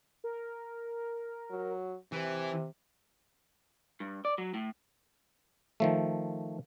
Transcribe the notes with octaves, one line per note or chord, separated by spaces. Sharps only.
A#4
F#3
C3 E3
G2
D5
F#3
A2
D#3 F3 A3